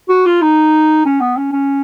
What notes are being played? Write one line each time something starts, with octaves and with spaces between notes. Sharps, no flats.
F#4
F4
D#4
C#4
B3
C#4
C#4